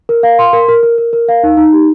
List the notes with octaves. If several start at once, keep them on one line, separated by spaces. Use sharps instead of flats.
A#4
F5
C6
A#4
A#4
A#4
A#4
A#4
F5
D#4
D#4
G4